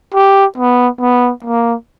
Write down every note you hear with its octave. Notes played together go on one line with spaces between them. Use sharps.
G4
B3
B3
A#3